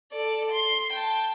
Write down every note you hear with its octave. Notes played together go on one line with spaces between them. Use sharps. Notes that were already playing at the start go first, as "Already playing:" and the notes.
A4 D5
C6
G5 A5